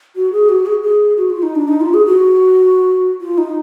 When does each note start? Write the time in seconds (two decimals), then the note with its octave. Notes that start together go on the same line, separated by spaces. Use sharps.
0.16 F#4
0.32 G#4
0.49 F#4
0.66 G#4
0.83 G#4
1.17 F#4
1.30 F4
1.42 D#4
1.55 D4
1.68 D#4
1.81 F4
1.94 G#4
2.06 F#4
3.21 F4
3.38 D#4